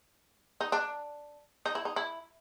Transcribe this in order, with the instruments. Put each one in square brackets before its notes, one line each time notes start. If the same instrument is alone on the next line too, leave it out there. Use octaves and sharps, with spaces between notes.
[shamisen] D#4
D4
D#4
E4
D#4
E4